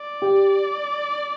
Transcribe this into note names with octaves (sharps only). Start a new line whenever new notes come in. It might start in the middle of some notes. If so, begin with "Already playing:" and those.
Already playing: D5
G4